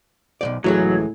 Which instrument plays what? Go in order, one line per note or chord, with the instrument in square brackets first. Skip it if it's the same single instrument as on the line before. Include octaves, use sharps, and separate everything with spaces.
[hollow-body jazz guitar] B1 E2 D5
[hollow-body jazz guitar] C#2 E3 G#4 [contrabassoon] A2 [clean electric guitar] F#3